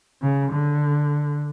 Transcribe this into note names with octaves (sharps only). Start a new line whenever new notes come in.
C#3
D3